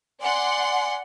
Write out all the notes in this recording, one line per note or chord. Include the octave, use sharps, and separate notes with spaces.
D5 F#5 G#5 C6